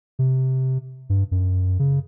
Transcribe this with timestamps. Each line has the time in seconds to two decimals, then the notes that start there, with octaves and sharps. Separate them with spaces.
0.19 C3
1.10 G2
1.31 F#2
1.79 C#3